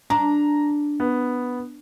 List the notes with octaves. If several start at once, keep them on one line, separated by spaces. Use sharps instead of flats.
D4 A#5
B3